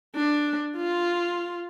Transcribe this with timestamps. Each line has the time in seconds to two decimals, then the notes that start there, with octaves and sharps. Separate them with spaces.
0.15 D4
0.77 F4